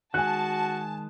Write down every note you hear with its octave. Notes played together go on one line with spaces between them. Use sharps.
D#3 G#3 F#4 G#5 A5 F#6